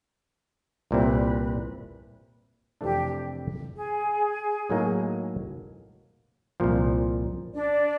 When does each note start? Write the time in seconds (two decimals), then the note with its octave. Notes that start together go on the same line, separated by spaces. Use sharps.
0.91 C2 A#2 G3 C4 E4 B4
2.81 F2 C3 E3 A3 D4 G4
3.75 G#4
4.70 A2 F#3 A#3 D#4
6.60 C2 A#2 F3
7.54 D4 D5